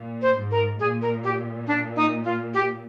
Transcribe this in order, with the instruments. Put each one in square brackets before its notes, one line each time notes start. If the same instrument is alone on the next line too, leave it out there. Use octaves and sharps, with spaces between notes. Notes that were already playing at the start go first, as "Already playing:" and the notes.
Already playing: [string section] A#2
[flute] C5
[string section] G#2
[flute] A#4
[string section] A#2 [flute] G#4
[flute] A#4
G4
D4
D#4
F4
G4